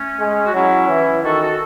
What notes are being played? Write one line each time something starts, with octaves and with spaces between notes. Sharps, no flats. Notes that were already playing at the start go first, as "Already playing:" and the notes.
Already playing: A3 C#4
G#3
F#4
F#3 C#4 E4
E3
D#3 F#4 A4
F#4 A4